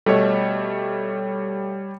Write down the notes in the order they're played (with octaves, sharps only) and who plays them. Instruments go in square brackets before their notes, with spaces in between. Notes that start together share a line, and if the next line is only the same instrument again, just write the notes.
[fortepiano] B2 A3 [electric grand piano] G3 C#5